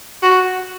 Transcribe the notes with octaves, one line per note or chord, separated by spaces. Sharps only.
F#4